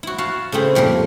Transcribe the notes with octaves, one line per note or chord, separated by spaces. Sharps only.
E4 F#4
F#4 F5 A5
C#3 A3 C4 E4
F2 A#2 G3 A#4